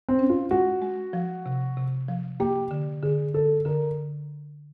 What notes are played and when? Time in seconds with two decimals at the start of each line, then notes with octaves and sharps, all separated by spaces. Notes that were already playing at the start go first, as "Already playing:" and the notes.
0.09 C4
0.19 C#4
0.30 F4
0.51 G#3 F#4
0.82 G#3
1.13 F3
1.46 C3
1.77 C3
2.08 F3
2.40 A#3 G4
2.71 D3
3.03 D3 G#4
3.34 D3 A4
3.65 D3 A#4